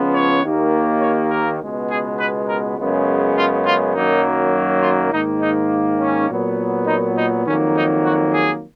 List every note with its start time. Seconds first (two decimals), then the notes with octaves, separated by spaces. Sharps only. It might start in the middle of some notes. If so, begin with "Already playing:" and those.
Already playing: C#2 C#3 F3 B3
0.13 C#5
0.43 D#2 D#3 A#3
1.01 C#5
1.30 A#4
1.60 C#2 B2 G#3 B3
1.89 G#4
2.18 B4
2.48 A#4
2.77 F#2 C#3 G#3 B3
3.36 F4
3.65 F4
3.94 F#2 D#3 F#3 A#3 D#4
4.81 F4
5.11 G#2 D#3 A#3 D#4
5.41 D#4
5.99 C#4
6.29 A#2 F#3 B3
6.86 D#4
7.17 D#4
7.45 F2 D#3 F#3 A#3 C#4
7.75 D#4
8.04 F#4
8.33 G#4